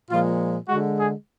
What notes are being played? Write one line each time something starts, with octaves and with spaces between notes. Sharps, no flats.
A#2 F3 G#3 F4
D3 G#3 F#4
G#4